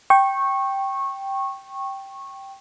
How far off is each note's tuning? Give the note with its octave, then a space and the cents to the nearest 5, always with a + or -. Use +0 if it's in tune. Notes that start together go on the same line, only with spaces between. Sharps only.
G5 -5 C#6 -20